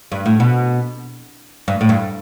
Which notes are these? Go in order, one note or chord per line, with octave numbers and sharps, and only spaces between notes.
G2
A2
B2
G2
A2
G2